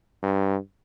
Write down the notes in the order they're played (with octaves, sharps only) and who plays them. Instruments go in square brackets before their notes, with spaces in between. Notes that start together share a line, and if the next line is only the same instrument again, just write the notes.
[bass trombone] G2